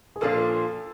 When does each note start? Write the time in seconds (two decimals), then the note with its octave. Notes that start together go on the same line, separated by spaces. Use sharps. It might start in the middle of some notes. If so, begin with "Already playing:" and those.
0.16 G#4
0.21 A#2 F3 A#3 D4 F4 A4